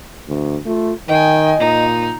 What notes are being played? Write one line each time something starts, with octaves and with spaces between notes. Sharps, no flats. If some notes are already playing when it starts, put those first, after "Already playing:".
D2
A3 F4
D#3 D#5 G5 G#5
A#2 D#4